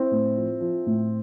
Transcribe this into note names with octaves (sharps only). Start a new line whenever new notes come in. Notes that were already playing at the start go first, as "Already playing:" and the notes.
Already playing: C4 E4
A2
F3
F3
A2